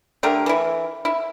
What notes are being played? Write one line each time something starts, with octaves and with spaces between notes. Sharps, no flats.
D3 A3 G4 A#4
E3 E4
E4